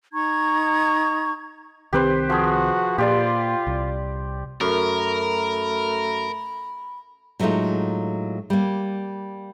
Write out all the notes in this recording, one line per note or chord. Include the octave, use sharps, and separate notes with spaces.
D#4 A#5 C#6 G#6
C2 D#3 C4 G4 B4 C5
F3 F#4 G#4
A#2 F4 G4 D5 C6
C2
F#2 A3 A#4 B5
A2 F#3 G#3 A3 D#4 F4
G3 A#3